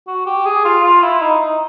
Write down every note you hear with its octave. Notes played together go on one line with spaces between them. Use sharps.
F#4
G4
G#4
F4
F4
E4
D#4
D#4